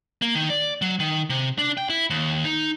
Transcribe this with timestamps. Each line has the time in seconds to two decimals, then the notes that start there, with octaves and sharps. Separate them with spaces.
0.22 A#3
0.35 D#3
0.50 D5
0.82 F#3
1.00 D#3
1.30 C3
1.58 D4
1.77 G5
1.90 E4
2.10 D#2
2.44 D#4